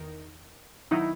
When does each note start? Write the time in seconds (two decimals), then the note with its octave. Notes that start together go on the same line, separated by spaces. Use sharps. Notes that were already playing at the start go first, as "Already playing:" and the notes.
Already playing: E2 D#3 D#4 A#4
0.91 D#3 F#3 B3 D#4 E4